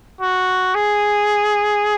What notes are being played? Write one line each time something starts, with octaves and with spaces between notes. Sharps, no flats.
F#4
G#4